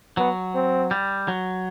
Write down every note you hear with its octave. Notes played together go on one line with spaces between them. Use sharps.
F#3 B3
C4
G3
F#3